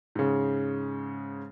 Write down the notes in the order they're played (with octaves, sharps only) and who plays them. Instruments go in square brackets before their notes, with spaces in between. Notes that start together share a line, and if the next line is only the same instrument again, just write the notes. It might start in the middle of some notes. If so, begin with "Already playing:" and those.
[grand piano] G#2 C#3